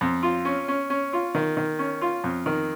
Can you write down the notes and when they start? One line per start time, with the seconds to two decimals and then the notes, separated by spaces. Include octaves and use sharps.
0.01 F2
0.23 F4
0.45 C#4
0.68 C#4
0.90 C#4
1.13 F4
1.35 D#3
1.57 D#3
1.79 C#4
2.01 F4
2.24 F2
2.46 D#3